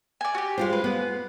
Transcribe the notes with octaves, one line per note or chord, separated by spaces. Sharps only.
D5 G#5
F#4 G4
G#3 F4 C5
B4
B3